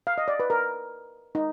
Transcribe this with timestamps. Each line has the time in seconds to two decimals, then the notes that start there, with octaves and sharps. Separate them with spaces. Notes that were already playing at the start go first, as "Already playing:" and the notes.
0.07 F5
0.18 D#5
0.28 D5
0.40 B4
0.50 A#4
1.35 D#4